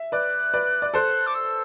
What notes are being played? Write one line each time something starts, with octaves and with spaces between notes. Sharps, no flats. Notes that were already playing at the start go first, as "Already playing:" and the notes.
Already playing: E5
B4 D5 F#6
B4 D5
D5
A4 C5 F#6
D6
E6